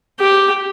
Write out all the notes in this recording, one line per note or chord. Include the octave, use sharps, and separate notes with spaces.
G4